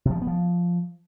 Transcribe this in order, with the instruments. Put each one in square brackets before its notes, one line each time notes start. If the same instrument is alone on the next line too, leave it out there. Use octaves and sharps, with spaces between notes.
[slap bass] C3
F3
G3
B3
F3